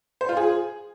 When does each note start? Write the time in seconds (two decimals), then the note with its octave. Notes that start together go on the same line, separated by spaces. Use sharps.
0.21 C5
0.29 F4
0.37 G#4